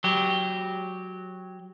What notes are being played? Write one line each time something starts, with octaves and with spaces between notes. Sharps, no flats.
F#3 G4